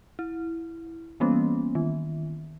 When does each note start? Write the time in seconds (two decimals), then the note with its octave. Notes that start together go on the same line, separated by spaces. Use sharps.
0.19 E4
1.20 E3 G3 A#3 B3 C#4
1.75 D#3